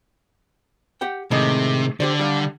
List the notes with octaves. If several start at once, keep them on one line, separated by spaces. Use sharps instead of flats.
G4 F#5 G5
A2 C3 D#3 G#3
D3 G4 C5 D5
G3 F5